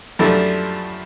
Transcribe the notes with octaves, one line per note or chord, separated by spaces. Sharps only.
F#2 F3 G3 A3 D4 E4